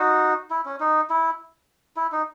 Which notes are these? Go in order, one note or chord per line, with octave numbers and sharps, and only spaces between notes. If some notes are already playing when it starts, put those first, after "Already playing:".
Already playing: D#4 F#4
E4
C#4
D#4
E4
E4
D#4